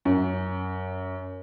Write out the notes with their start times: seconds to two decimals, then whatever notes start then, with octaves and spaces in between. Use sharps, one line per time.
0.05 F#2